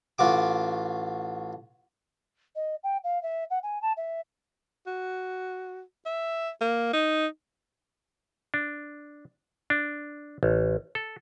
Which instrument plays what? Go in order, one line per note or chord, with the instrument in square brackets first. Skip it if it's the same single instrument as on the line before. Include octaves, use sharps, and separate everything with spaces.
[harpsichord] A1 F4 F#4 D6
[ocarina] D#5
G5
F5
E5
F#5
G#5
A5
E5
[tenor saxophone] F#4
E5
A#3
D#4
[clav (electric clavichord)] D4
D4
A1
A4